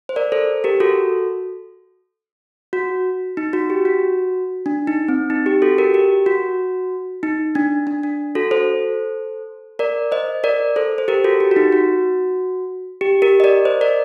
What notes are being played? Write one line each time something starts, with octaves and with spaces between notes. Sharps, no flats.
C5
A#4 D5
A4 C5
G4 A#4
F#4 A4
F#4
D#4
F#4
G4
F#4
D4
D#4
C4
D#4
G4
F#4 A4
G4 A#4
G4
F#4
D#4
D4
D4
D4
F#4 A4
A4 C5
A#4 D5
C5 D#5
A#4 D5
A4 C5
C5
G4 A#4
F#4 A4
G4
F#4
D#4
F#4
G4
G4 A#4
D#5
A#4 D5
C5 D#5
A#4 D5